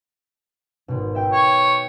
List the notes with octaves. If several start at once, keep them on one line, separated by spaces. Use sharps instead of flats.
G#1 B2
E5 G5
C#5